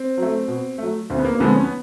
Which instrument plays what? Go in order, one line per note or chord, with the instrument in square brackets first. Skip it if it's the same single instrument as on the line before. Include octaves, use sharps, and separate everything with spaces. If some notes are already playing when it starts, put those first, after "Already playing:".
Already playing: [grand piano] C4
[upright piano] F#3 A3
B2
F#3 A3
[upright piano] D2 [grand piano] C4
[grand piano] B3
A#3
A#3
[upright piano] D3 F3 G#3 C4 [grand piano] B3
[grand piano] C#4
B3